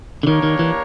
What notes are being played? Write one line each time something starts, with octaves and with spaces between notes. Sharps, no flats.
D3
D#3 A#3 D4 G4 A#4 C#5
D#3
E3